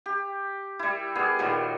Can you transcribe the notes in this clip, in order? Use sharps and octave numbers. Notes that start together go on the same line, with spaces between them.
G4
G3 E4
G3 B3 G#4
A#2 D#3 F#3 G3